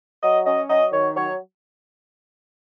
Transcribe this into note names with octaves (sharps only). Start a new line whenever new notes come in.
F#3 D#5
C#4 D#5
F#3 D#5
D#3 C#5
F#3 C#5